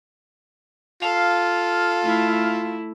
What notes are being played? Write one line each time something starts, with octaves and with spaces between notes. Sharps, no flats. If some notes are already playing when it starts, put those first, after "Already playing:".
F4 A4 F5
A3 E4